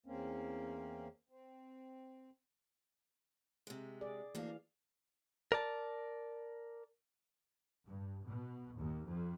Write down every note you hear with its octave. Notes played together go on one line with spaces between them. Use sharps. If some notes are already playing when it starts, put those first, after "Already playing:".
E2 A#3 C4 C#4
C4
C3 G#3
G#4 D5
D2 E3 A#3 D4 F5
A#4 D5 A5
G2
B2
D#2
F2